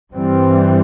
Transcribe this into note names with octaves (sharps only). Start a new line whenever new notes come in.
G2 E3 G3 C4